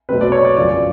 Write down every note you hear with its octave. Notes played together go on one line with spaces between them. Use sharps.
B2 F#3 A3 C4 B4
D5
C#5
D5
F#2 C#3 F3 D5